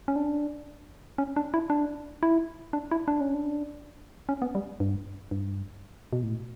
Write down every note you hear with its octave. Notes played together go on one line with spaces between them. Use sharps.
C#4
D4
C#4
D4
E4
D4
E4
D4
E4
D4
C#4
D4
C#4
B3
G3
G2
G2
B2
A2